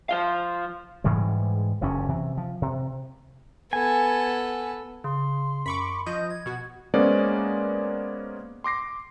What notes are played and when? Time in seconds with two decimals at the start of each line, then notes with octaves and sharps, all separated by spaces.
0.09 F3 F4 F5
1.04 G#2 E3 G3 G#3
1.81 F#1 E2 G2 C#4
2.08 C3 E3
2.37 F3
2.62 C3
3.73 B3 A4 G#5
5.04 C#3 C6
5.66 F#2 B5 C#6 D6
6.06 F3 D#5 G6
6.30 G#6
6.46 B2 F#4
6.94 G#3 A#3 B3 C#4 C5 D5
8.64 C6 D6 A#6 C7